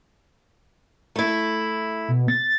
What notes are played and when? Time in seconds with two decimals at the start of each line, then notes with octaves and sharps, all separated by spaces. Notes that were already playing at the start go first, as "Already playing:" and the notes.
1.16 A3 E4
2.08 B2
2.28 A6